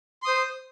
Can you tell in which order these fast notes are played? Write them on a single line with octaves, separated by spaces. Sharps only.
C6 D#6 C5